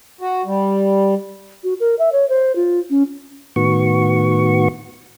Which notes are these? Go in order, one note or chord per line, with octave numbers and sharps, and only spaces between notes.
F#4
G3
F#4
A#4
E5
C#5
C5
F4
C#4
A2 D#3 B3 F#4 C#6